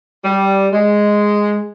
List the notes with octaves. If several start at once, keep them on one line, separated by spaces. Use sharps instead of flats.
G3
G#3